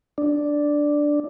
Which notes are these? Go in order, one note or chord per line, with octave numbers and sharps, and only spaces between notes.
D4